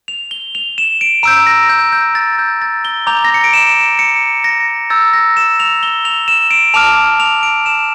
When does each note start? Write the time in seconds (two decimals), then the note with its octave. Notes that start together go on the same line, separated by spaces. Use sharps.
0.08 F7
0.31 G7
0.55 F7
0.78 E7
1.01 D7
1.23 A#5 E6 G6 D7
1.47 A#6
1.69 G6
1.93 G6
2.15 A6
2.39 G6
2.62 A6
2.85 G7
3.07 A#5 D6 G6 F7
3.24 A#6
3.34 C#7
3.44 D7
3.53 E7
3.99 C#7
4.44 A#6
4.90 A#5 E6 G6 A6
5.13 A#6
5.37 E7
5.60 F7
5.83 G7
6.05 F7
6.28 E7
6.51 D7
6.74 A5 D6 F6 F7
7.20 F7
7.43 D7
7.66 E7